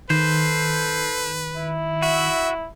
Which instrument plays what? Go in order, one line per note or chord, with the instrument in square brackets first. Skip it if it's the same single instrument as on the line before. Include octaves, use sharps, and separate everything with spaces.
[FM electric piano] D#3 [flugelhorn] A4 [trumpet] B4 [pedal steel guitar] C5
[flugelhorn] E4
[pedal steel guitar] F#4 [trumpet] E5